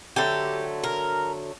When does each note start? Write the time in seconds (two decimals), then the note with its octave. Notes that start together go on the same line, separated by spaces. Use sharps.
0.16 D3 F#3 A3 G4
0.84 A#4